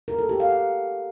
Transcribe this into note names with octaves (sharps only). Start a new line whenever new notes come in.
A#4
A4
G4
F5
F#5